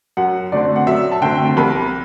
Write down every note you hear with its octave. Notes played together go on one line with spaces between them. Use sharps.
F#2 F#5
D3 A3 C4 D5
F#5
F#2 E5
A5
D3 A3 C4 G5
C2 B5